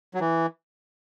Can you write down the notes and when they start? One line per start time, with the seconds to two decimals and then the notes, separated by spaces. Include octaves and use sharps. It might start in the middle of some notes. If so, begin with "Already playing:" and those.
0.14 F#3
0.20 E3